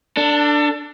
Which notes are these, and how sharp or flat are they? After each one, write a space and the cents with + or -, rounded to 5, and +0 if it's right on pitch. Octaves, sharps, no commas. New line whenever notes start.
D4 +0 A4 +30